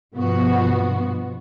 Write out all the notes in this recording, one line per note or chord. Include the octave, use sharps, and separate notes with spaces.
G2 B2 F3 B3 F#4